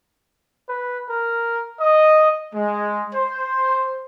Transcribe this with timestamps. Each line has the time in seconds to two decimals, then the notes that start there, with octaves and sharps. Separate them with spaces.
0.69 B4
1.09 A#4
1.80 D#5
2.55 G#3
3.14 C5